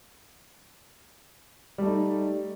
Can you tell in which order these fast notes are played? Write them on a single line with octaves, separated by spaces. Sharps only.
G3 A3 D#4